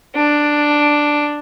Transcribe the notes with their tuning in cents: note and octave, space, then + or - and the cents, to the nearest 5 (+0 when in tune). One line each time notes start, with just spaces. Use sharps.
D4 +5